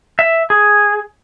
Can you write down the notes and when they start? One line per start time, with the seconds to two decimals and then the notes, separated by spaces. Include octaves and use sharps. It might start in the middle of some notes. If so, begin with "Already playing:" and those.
0.19 E5
0.50 G#4